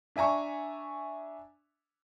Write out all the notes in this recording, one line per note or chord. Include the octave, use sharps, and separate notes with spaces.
D4 E5 G#5 A#5 C#6